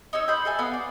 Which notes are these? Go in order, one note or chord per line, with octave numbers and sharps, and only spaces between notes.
D#4 C#5 D#5 E6
C5 B5 G6
A4 E5 G#5
B3 D#5 F5
D5